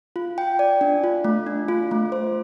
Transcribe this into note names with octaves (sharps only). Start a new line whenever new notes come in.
F4
G5
D5
D4
F4
A3
D4
F4
A3
C5